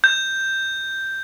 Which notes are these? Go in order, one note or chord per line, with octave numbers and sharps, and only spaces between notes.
G6